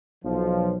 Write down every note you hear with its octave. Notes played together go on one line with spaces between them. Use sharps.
B1 F3